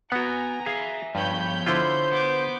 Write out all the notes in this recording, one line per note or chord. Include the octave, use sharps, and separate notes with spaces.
B3 F#4 F#5 G#5 A#5
G#4 E5 F5 G#5
G2 F3 B3 C#5 B5 G6
D3 E4 F4 C5
B3 D6 G6